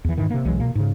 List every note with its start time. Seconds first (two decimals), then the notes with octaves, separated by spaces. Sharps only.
0.05 E2 E3
0.17 G#2 D#3 E3
0.30 C3 A#3
0.45 B1 E3 F#3 G#3
0.60 B2 A#3
0.75 G#2 C#3